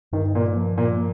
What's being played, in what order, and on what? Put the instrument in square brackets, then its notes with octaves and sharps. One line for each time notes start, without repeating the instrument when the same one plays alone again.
[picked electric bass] G2 [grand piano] D#3
[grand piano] A#2
[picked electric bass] F3
[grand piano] A#2